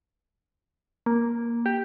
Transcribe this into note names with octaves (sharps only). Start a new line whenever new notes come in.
A#3
G4